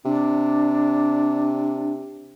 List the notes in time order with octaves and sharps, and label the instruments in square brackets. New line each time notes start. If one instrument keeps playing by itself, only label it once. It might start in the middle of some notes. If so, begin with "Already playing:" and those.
[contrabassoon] C3 [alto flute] D4